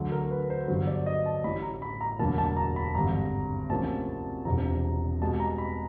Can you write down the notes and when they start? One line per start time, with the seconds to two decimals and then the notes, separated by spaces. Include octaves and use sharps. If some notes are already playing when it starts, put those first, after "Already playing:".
Already playing: D2 D3 F#3 A3
0.12 A#4
0.31 B4
0.50 C5
0.68 G1 G2 D3 F#3 C5
0.87 D5
1.06 D#5
1.26 A5
1.44 A1 A2 E3 B5
1.62 A#5
1.82 B5
2.01 A#5
2.19 E1 D2 D3 F#3 A#3 A5
2.38 A5
2.57 A#5
2.76 B5
2.95 G#1 G2 D3 A#5
3.70 D2 C3 F3 A#3 C#4 A5
4.45 E1 E2 C3 F3 A#5
5.21 C2 B2 G#3 A5
5.40 A#5
5.58 B5